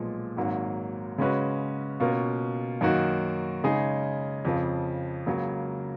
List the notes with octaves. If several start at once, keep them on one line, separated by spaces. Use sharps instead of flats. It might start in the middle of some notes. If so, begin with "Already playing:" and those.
Already playing: B1 A#2 F3 G#3 B3
G#1 G#2 F#3 A#3
C#3 G#3 C#4 F#4 B4
B2 A#3 C#4 F4 A#4
F#2 D#3 A#3 D#4 F#4
C#3 G#3 D#4 G#4
F2 C#3 F3
C#2 C#3 F#3 A#3